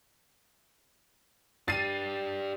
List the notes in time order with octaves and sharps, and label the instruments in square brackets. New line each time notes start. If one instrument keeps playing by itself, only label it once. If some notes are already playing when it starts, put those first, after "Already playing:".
[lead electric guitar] D4 G4 [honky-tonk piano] A6 C7 D#7